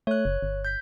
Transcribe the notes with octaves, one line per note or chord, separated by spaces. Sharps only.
A3 C#5 F#6
F#1
G1
G6 B6